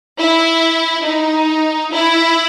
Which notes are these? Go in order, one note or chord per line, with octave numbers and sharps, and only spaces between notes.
E4
D#4
E4